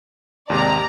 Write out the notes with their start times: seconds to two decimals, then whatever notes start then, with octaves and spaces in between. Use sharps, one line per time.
0.50 D#2 G#2 C3 D5 A#5